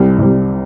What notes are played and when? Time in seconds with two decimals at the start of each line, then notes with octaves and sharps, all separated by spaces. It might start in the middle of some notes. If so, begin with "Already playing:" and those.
Already playing: C2 C3 G3
0.18 C2 C3 G3